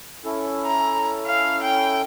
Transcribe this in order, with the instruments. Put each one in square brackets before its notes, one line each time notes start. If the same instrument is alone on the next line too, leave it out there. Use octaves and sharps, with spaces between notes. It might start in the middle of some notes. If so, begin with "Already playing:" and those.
[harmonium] C#4 E4 A4
[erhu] A#5
F5
G5